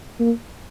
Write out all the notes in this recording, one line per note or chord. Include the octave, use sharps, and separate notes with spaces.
A#3